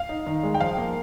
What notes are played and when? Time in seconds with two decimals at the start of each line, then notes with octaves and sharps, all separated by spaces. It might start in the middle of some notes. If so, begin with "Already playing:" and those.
Already playing: F5
0.09 D#4
0.26 D#3
0.43 G#3
0.55 G5
0.60 F3 F5
0.78 A#3